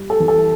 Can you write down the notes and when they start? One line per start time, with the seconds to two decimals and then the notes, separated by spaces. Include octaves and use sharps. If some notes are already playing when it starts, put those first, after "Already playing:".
Already playing: G3
0.10 A4
0.20 E3
0.28 A4